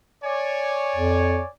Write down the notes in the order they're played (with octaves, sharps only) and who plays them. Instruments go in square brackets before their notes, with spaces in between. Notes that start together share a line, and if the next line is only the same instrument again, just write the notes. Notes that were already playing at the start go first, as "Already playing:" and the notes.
[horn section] C#5 D5 G#5
[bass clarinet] F2